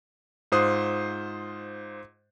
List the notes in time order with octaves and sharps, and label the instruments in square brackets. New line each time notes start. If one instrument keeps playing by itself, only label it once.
[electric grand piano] G#2 F4 C5 D#6 F#6 C7